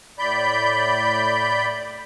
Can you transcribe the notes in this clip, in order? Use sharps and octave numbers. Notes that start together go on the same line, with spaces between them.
A2 D5 B5 G6